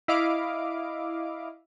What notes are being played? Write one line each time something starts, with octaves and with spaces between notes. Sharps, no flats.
E4 D#5 F5 D6